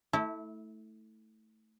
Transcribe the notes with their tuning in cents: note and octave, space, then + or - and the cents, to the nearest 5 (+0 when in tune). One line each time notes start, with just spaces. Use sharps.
A3 +0 E4 -25